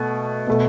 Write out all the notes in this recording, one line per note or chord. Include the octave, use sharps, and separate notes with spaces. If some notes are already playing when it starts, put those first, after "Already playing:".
Already playing: B2 A3
B2 A3